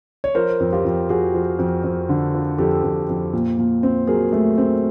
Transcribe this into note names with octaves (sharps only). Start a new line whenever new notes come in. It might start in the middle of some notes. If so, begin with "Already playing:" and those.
C#5
F3 A#4 C5
F2
F4 G4
F2
F2 F#4 G#4
F3
F2
F2
D3
F3
F2 G4 A4
F2
F2
A#2
A#2
C4
F#3 G#4 A#4
A3
C4